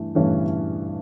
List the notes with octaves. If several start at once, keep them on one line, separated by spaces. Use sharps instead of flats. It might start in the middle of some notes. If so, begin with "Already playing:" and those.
Already playing: G2 E3 A3
G2 E3 A3 C#4